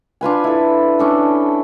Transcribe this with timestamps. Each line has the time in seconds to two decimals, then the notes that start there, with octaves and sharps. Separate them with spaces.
0.21 D4 F4 B4 G#5
0.44 E4 A4
0.99 C#4 D4 A4